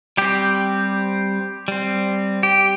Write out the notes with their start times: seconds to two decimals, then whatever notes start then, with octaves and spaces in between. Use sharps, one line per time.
0.17 G3 C4 G4
1.68 G3 C4
2.43 G4